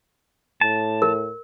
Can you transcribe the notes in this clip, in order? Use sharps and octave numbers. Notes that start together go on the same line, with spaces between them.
A2 A5
A#4